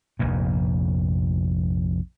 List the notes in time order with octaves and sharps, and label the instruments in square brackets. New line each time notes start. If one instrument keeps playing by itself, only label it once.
[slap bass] F1 A#1 F2 G#2